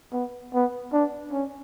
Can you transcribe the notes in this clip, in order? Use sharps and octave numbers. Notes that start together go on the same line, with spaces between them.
B3
B3
D4
C#4